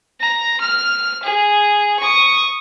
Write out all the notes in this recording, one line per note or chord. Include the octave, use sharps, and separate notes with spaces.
A#5
F6
G#4
C#6 D#6